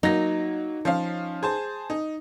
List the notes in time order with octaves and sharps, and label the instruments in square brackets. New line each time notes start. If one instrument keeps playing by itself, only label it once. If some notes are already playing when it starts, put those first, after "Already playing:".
[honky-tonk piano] F#3 A#3 A#6 [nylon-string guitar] D#4
[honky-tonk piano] F3 C#4 F5
G#4 C5 A5
D#4